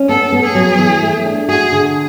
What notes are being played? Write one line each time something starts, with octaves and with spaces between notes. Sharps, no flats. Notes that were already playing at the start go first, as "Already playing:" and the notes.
Already playing: C#4
B3 A4
B3
G#4
F#3
E3
A3
D4
F#4 G#4
D3